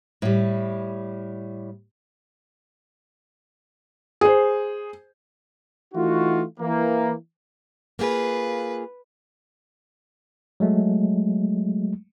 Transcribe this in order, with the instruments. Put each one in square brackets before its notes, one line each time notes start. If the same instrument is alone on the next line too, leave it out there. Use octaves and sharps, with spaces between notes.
[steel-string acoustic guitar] A2 G3
[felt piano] G#4 C5
[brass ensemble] E3 A3 D#4 F4 F#4
E3 A#3
[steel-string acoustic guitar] A#3 F4 G#4 [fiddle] B4
[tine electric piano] F#3 G#3 A3